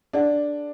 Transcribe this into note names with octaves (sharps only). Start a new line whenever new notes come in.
D4 G#4 D5 F#5